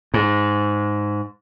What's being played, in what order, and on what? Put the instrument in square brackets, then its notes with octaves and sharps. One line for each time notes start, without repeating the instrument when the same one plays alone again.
[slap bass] G#2